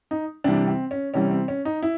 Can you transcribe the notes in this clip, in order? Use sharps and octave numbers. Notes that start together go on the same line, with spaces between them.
D#4
C3 E3 G3 D4
C4
C#4
C3 E3 G3 C#4
C4
C#4
D#4
E4